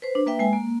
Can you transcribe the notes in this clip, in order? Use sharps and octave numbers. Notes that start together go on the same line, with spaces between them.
B4 C5
D4
A#3 B4 E5 G5
G#3 G#5
A#3